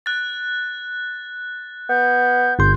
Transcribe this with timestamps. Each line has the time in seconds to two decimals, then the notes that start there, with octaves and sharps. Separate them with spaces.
0.06 F#6 A6
1.89 B3 G6
2.59 G1 C6 G6